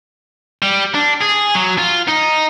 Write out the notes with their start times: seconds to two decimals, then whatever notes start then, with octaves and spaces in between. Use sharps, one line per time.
0.62 G3
0.94 D4
1.21 G#4
1.55 F#3
1.78 F4
2.08 D#4